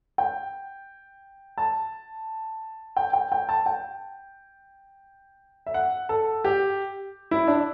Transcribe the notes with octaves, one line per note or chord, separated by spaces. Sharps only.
G5
A5
G5
G5
G5
A5
G5
E5
F#5
A4
G4
E4
D4